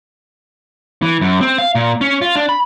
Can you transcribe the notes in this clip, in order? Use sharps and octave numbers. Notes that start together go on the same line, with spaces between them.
E3
F#2
C4
F5
A#2
C#4
F4
D4
B5